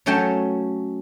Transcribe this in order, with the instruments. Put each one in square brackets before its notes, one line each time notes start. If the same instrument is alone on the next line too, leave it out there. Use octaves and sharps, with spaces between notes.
[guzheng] F#3 A3 C#4 G5 A5